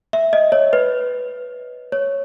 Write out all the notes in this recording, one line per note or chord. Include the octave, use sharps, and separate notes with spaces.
E5
D#5
C#5
B4
C#5